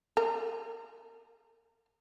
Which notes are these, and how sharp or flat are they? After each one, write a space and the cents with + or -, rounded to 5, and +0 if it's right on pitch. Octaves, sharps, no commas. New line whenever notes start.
A#4 -40